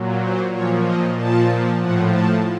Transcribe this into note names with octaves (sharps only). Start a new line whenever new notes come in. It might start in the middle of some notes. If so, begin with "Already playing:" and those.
Already playing: A#2 F#3
C5
A#2 F3 C#5
D#5
A#2 F3 A5
A2 F3 F#5
A5